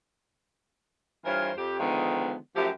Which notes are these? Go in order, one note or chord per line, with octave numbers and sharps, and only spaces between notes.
G2 E3 F4 A#4 C5 C#5
F2 G4
D3 D#3 F3 G#3 B3
F#2 F3 A3 G4